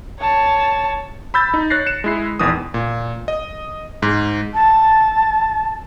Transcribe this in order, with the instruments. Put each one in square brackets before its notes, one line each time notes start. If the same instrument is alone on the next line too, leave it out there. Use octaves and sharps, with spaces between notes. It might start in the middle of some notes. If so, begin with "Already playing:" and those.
[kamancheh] C#5 A5
[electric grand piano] B5 E6 G6 A6
D#4
C#5 F#6 A6 A#6 C7
C#7 E7
G#3 E4 C7
A#1 E2 D#3 E3 D#6
A#2
D#5
G#2
[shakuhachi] A5